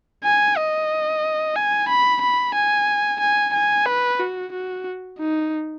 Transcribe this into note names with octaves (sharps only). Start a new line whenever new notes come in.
G#5
D#5
G#5
B5
B5
G#5
G#5
G#5
B4
F#4
F#4
D#4